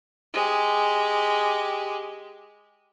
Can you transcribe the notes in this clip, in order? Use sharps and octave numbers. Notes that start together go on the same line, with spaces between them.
G#3 G4